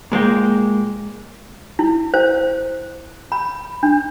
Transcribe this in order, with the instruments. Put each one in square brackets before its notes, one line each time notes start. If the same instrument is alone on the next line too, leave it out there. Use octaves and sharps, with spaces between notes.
[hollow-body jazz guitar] A#2 G#3 A#3 G5
[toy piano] E4
C5
B5
D4